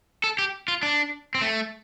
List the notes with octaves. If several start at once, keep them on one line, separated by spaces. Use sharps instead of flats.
A4
G4
F4
D4
C4
A3